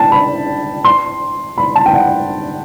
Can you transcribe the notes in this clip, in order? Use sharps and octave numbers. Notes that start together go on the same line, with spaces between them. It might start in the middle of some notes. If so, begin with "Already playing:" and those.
Already playing: G5 A5
B5
C6
B5
A5
G5
F#5